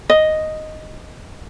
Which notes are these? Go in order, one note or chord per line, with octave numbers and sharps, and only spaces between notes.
D#5